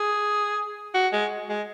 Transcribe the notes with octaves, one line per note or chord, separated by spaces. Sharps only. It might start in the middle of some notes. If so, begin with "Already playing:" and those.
Already playing: G#4
F#4
G#3
G#3